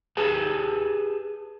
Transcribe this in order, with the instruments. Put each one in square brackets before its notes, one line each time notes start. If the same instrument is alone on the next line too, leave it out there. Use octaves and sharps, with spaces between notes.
[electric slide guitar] G4 G#4 B4 A5